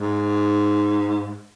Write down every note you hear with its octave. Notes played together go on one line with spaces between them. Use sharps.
G#2